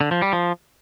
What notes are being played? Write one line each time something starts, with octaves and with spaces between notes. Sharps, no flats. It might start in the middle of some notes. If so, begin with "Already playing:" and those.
D3
F3
G3
F3